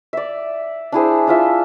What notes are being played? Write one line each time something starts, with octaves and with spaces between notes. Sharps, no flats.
D5 E5
D4 E4 G#4 C5
D4 F4 E5